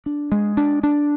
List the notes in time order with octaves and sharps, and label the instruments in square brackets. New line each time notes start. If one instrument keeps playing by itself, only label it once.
[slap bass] D4
G#3
D4
D4